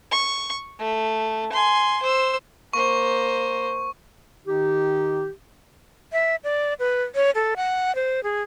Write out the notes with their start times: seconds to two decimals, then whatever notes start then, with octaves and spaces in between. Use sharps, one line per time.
0.11 C#6
0.78 A3
1.52 G#5 C6
2.02 C5 E6
2.73 A#3 C5 C#6
4.46 D#3 D#4 G4
6.13 E5
6.44 D5
6.79 B4
7.15 C#5
7.35 A4
7.56 F#5
7.95 C5
8.24 G#4